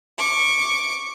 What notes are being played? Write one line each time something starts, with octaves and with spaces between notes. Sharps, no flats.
C#6 D6